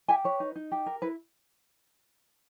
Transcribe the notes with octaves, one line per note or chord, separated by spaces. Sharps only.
G4 E5 G#5
B4 C#5
D#4
D#4
G4
A#4
E4 B4